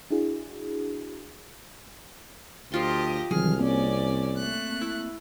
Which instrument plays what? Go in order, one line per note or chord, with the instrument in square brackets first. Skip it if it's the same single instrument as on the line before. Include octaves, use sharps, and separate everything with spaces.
[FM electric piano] D4 E4 F#4 G#4
[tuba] D2 [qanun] F3 F4 C6 [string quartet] G4 D#5
[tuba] C2 [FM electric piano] D#3 E3 F#3 [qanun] G#4 [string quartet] F6
[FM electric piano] A#3 C4 [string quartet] C#4 D5
[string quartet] A3 F#6
[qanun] E4